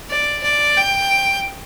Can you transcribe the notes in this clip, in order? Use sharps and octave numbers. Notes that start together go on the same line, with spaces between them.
D5
D5
G5